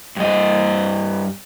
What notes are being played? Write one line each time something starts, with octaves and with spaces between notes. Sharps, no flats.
G2 D#5